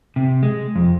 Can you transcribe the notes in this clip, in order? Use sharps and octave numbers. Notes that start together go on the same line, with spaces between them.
C3
G#3
F2